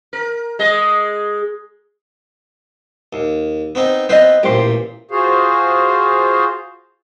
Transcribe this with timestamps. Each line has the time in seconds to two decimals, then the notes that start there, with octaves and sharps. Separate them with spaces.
0.13 A#4
0.59 G#3 D#5
3.13 D#2
3.75 B3 C4 D#4
4.09 B3 C4 B4 C5 D#5
4.43 A1 A#2 G4 C5
5.11 F4 F#4 G#4 C5 F5